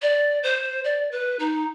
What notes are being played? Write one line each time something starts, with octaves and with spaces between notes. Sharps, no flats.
D5
C5
D5
B4
D#4